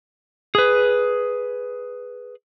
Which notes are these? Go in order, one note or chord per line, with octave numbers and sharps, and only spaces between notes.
G#4 B4